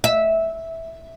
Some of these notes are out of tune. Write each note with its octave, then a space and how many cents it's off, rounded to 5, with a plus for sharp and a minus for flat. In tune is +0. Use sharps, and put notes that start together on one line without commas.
E5 -10